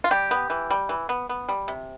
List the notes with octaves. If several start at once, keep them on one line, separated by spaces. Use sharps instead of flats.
F4
G3 G4
B3
E3
G3
E3
B3
B3
G3
C3